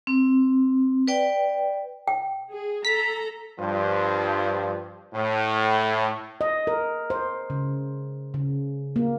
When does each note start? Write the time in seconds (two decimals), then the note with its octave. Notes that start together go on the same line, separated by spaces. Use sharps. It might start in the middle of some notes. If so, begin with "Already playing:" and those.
0.07 C4
1.08 B4 D5 G5
2.08 G5
2.50 G#4
2.85 A4 A#5 B6
3.59 G2 F3
5.14 A2
6.41 D#5
6.67 A#4
7.10 C5
7.50 C#3
8.34 C#3
8.96 A#3